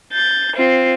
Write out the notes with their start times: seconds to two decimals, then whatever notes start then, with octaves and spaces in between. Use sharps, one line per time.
0.13 G6 A6
0.56 C4 F4